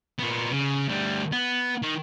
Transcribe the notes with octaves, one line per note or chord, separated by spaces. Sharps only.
A#2 B3
C#3
D2 G3
B3
D#3